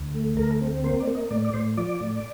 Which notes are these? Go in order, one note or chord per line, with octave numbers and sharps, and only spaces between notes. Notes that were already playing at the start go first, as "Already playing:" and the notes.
Already playing: D2
A3
D2 A#4
C4
A#3 C5
D5
A#3
D#5
A2 D5
D5
A2 C5
F3 D5
A2